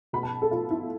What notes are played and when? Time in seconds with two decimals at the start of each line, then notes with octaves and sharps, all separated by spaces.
0.13 B2 B5
0.23 A5
0.42 A4
0.51 F4
0.71 E4